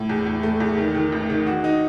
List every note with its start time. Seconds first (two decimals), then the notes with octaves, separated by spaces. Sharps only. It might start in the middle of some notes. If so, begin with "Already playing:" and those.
Already playing: A2
0.09 E2
0.27 E2
0.43 A3
0.60 E2
0.78 D#3
0.95 D#3
1.12 A1
1.30 D#3
1.46 F#4
1.64 D#4